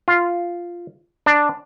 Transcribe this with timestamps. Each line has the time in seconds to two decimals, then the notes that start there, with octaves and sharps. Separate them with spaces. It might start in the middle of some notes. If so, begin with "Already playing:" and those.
0.08 F4
1.26 D4